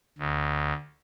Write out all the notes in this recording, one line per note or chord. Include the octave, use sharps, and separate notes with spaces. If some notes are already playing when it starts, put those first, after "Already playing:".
D2